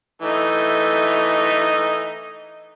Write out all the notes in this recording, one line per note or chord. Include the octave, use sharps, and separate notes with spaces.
E3 A3 D#4